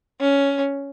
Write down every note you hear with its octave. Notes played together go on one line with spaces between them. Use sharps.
C#4